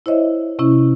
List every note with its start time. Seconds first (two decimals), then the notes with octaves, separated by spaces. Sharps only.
0.06 E4 C5 C#5 D#5 E5
0.59 C3 C#4 E4